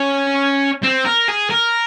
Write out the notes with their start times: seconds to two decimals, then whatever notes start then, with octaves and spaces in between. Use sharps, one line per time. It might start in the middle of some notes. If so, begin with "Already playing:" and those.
Already playing: C#4
0.83 C4
1.05 A#4
1.28 G#4
1.50 A#4